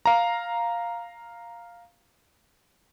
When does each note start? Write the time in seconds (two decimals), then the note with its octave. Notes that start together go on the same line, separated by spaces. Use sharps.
0.06 F5 A#5